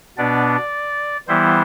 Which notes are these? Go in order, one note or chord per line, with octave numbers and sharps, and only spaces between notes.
B2 B3 D4 D5
E3 G3 B3 E4 C5